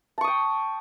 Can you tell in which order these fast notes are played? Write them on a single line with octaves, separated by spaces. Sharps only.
A5 C#6 D#6 G5